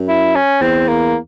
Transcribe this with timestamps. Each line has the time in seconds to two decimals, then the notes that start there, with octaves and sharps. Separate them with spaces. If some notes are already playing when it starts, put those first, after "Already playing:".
Already playing: F#2
0.09 E4
0.36 C#4
0.61 E2 C4
0.88 A#3